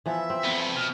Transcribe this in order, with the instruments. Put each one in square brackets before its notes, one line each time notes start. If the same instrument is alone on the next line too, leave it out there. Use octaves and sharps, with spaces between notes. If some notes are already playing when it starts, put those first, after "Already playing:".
[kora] E3 F3 B3 [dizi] E5
[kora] C4
[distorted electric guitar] F2 B3
[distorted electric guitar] B2 [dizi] F6